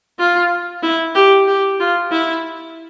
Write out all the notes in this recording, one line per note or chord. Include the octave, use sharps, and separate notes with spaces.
F4
E4
G4
G4
F4
E4